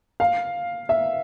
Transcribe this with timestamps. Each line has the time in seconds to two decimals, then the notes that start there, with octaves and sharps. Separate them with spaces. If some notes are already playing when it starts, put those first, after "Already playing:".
0.20 F5
0.89 E5